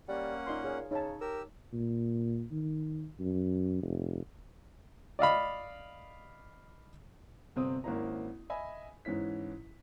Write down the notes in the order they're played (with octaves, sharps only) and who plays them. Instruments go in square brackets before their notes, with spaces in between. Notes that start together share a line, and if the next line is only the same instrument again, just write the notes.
[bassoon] G3 [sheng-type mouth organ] A#3 C#4 F#5
[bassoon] A#2 [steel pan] D#4 D#5 C6
[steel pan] G#4 C#5 F5
[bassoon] C#3 [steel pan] D#4 C#5 A5
[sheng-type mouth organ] G4 E6 [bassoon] A#4
[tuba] A#2
D#3
F#2
F1
[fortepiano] D5 D#5 F5 B5
[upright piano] G1 C3 C4 D#6
G#1 A#3 C#4 E4 C5 A#5
D#5 E5 G#5 B5
G#2 E3 C#4 E4 B6